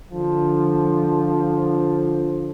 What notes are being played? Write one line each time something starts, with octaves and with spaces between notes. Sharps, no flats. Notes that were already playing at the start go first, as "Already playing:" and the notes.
D3 F3